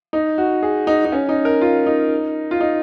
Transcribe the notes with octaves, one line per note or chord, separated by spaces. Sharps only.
D#4
F#4
G#4
D#4
D#4
C#4
D#4
A#4
F4
D#4
F4
D#4